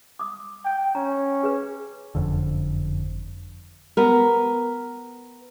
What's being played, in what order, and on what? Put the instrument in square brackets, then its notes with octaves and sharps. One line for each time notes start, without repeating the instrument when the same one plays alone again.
[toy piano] D6 D#6
[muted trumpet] G5
[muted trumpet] C#4 [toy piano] A#5
[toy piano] G#4 B4
[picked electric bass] F#1 F2 D3
[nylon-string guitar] B3 A#4